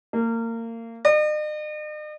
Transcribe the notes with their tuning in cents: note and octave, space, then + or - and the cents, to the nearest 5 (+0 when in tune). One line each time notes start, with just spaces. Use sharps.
A#3 -30
D#5 -45